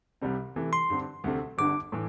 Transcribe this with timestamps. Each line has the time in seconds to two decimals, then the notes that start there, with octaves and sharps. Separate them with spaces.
0.21 C2 C3 G3 C4
0.56 C3 E3 A3
0.73 C6
0.90 G2 D3 C4
1.24 D2 C3 A3 C4
1.58 G1 G2 D3 D6
1.92 A2 E3